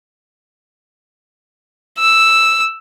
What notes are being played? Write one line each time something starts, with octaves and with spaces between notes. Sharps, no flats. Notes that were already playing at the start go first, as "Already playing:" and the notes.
E6